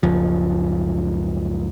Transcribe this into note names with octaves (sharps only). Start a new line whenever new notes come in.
F#1 C#2 F3